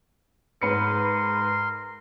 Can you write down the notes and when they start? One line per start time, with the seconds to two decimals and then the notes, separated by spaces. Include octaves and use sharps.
0.62 G#2 A#4 B4 C6 C#7